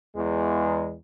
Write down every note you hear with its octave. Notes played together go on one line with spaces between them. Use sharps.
E2 G#3